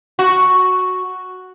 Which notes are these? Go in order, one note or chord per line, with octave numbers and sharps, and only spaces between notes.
F#4